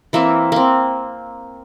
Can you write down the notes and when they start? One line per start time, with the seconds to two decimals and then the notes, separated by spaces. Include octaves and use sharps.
0.13 E3 A#3 C4 E5
0.52 A#3 C4